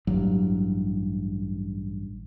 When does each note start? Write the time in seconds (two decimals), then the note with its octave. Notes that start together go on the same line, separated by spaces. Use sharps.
0.07 A1 G2 F#3